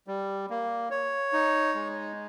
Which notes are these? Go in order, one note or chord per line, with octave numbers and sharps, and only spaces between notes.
G3
A#3
C#5
D#4
G#3